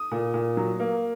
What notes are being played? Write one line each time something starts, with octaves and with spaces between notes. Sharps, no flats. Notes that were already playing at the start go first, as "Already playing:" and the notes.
Already playing: D#6
A#2
A#2
F#3
A#3